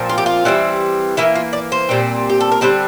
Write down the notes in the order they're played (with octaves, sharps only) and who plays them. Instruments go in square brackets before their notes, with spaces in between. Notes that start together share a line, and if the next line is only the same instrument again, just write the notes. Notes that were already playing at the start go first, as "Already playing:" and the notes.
Already playing: [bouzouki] A#2 F3 C4
F4
G4
F4
E3 G3 C4
E3 A#3 E4
F4
D5
C5
A#2 G3 C4
G4
A4
A#4
D3 G3 C4 C5